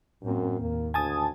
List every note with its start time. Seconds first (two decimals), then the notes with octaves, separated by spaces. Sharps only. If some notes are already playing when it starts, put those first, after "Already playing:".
0.23 F#2 A2 A#3 C4
0.60 D#2 A#3
0.94 D2 G#5 A5 D#6